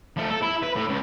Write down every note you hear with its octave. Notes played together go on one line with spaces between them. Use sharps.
F3 A3
A4
E4
B4
A2
C#2